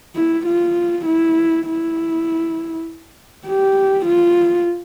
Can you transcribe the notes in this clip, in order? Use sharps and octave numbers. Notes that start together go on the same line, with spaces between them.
E4
F4
E4
E4
G4
F4